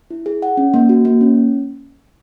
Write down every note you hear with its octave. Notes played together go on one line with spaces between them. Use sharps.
E4
G#4
F#5
C#4
A#3
F#4
A#3
C#4